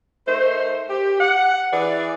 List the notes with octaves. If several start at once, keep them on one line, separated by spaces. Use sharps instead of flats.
A3 D#4 A#4 C5
G4
F#5
E3 G#4 B4 D5